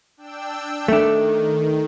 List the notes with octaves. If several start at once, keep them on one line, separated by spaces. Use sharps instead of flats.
D4 G5 E6
D#3 A3 D4